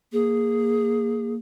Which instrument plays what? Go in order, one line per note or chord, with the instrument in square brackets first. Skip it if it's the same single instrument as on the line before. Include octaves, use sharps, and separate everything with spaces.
[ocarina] A#3 [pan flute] G#4